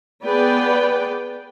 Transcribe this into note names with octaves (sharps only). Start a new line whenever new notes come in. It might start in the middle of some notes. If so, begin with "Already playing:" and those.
B3 G#4 B4 D5 G5